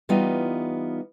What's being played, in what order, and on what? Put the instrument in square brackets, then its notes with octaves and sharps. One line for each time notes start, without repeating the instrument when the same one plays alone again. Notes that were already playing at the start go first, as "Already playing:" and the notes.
[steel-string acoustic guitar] E3 G3 B3 D#4 F4